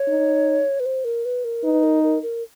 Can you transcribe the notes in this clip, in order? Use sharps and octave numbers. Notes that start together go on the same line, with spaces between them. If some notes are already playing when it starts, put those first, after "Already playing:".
Already playing: C#5
D#4
B4
C5
A#4
B4
A#4
D#4 B4
A#4
A#4
A#4